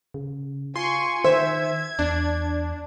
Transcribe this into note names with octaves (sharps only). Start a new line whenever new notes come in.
C#3
F4 G#5 C6 C#6
D#3 C5 E5 G#6
E2 D4